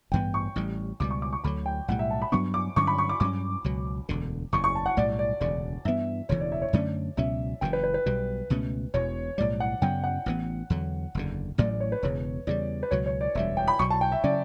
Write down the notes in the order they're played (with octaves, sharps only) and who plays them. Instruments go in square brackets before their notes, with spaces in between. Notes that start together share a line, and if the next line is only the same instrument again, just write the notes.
[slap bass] A1 G2 E3 B3 [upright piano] G5
[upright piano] C#6
[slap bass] A1 A2 G3
[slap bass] C#2 B2 G3 [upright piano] D6
[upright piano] C#6
D6
C#6
[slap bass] D2 D3 F#3 [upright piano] B5
[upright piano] G5
[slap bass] B1 A2 G3 [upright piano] F#5
[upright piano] E5
A5
B5
[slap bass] G2 F#3 B3 D4 [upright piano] C#6
[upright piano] D6
[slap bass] G2 D3 F#3 C#4 [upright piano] C#6
[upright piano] B5
C#6
D6
[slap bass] G2 F#3 C#4 [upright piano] D6
[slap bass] C#2 B2 F#3
E1 D2 D3
[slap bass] F#1 E2 C#3 [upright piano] C#6
[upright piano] C#6
A5
F#5
[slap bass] B1 A2 G3 [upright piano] D5
[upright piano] D5
[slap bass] E1 D2 C#3 [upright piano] D5
[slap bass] G2 E3 B3 [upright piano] E5
[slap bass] E1 D2 C#3 E3 [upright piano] C#5
[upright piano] D5
E5
C#5
[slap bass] F#2 D3 A3 C#4 [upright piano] D5
[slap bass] C#2 B2 F#3 C#4 [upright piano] E5
[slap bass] F#1 F#2 C#3 E3 [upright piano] G5
[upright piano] B4
B4
B4
[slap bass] B1 B2 G3
C#2 B2 A3 C#4
[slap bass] E1 E2 B2 [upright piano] C#5
[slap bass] B1 A2 G3 [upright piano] D5
[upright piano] F#5
[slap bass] F#2 C#3 F#3 B3 [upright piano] G5
[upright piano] F#5
[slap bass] A1 G2 E3 B3
E2 D3 F#3
F#1 E2 D3
[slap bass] A1 A2 F#3 A3 [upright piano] D5
[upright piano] D5
C#5
B4
[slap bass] E1 E2 C#3 [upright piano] C#5
[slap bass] E2 C#3 G3 [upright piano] D5
[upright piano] B4
[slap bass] C#2 B2 F#3 [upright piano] C#5
[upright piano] C#5
D5
[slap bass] E1 D2 D3 G3 [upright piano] E5
[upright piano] G5
B5
[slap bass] B1 B2 F#3 [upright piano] C#6
[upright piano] A5
G5
E5
[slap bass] C#3 F#3 C#4 [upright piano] D5